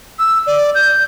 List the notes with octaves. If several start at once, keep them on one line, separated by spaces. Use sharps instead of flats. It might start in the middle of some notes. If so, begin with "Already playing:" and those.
E6
D5
G6